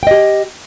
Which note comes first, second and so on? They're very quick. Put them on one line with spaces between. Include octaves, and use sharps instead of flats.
G5 D#5 G4